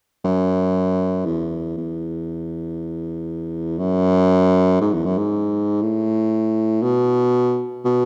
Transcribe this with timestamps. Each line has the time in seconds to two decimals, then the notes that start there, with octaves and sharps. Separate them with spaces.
0.25 F#2
1.25 E2
1.77 E2
3.79 F#2
4.81 G#2
4.93 E2
5.05 F#2
5.18 G#2
5.82 A2
6.83 B2
7.85 B2